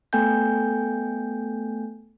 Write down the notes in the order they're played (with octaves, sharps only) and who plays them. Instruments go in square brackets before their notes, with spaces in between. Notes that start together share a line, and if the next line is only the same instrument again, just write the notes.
[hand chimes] A3 B3 A4 G5 G#5 G6